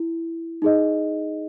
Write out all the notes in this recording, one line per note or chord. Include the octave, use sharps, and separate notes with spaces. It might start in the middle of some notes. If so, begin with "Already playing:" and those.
Already playing: E4
D#4 G#4 D#5